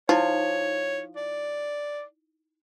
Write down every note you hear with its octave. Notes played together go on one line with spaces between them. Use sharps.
F3 D#4 E4 C#5
D5